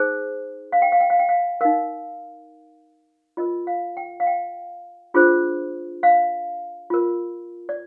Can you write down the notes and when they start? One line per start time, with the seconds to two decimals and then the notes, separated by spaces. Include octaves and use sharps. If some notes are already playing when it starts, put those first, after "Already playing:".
Already playing: D#4 G#4 C5
0.72 F5
0.82 G5
0.92 F5
1.00 G5
1.10 F5
1.19 G5
1.29 F5
1.61 D#4 A#4 F5
3.37 F4 A#4 D#5
3.67 F5
3.97 G5
4.20 F5
4.27 G5
5.14 D4 F4 G#4 C5
6.03 F5
6.90 F4 A#4
7.69 D5